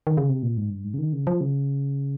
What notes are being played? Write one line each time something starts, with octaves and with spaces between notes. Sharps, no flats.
D#3
C#3
C3
A#2
G#2
G2
G#2
C#3
D#3
C#3
F3
C#3